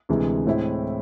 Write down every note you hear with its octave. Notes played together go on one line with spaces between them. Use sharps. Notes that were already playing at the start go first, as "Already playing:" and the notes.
D2 C3 E3 G#3
A2 G#3 C4 E4